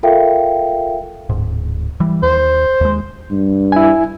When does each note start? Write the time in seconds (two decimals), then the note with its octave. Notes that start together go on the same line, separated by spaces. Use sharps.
0.03 F4 A4 A#4 E5 F5 G5
1.29 D1 G#2
2.00 E3 G3
2.23 D#2 C5
2.81 D#2 G#3
3.31 G2
3.72 E4 G#5